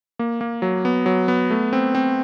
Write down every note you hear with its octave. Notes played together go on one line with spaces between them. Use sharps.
A#3
A#3
F#3
B3
F#3
B3
A3
C4
C4